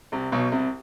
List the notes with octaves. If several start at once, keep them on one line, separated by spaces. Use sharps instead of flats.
C2 C3
B1 B2
C2 C3